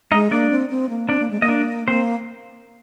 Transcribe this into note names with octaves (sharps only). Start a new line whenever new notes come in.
G#3 D#4 D#5
A#3 D4 D5
C4
C4
A#3
C4 D4 D5
A#3
G#3
A#3 D#5
D4 D5
A#3 C4 C5